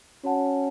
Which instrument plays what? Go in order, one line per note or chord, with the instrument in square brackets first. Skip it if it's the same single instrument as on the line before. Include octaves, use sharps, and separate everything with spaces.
[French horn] C#4 [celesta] F#4 C#5 F#5 A5